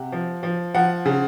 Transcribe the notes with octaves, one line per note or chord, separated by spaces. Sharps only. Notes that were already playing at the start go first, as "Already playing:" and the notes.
Already playing: C3 F#5
F3
F3
F3 F#5
C#3